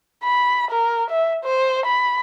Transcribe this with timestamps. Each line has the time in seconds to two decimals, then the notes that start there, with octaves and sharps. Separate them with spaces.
0.23 B5
0.70 A#4
1.10 E5
1.44 C5
1.85 B5